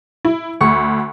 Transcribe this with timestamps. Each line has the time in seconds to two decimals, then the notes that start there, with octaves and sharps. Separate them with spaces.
0.25 E4
0.61 D2 C#6